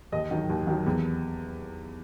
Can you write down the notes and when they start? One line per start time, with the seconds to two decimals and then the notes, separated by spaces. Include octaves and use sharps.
0.12 D#2 D#5
0.31 D#3 F#3
0.50 D#2
0.67 D#3 F#3
0.86 E2